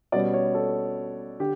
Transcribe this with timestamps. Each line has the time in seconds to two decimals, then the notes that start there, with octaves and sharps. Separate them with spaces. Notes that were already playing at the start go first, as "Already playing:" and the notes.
0.12 B2 G3 C#4 D5
0.33 C#5
0.55 A4
1.40 D3 G4